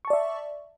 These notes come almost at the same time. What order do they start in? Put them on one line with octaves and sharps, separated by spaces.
C#6 A5 D5 E5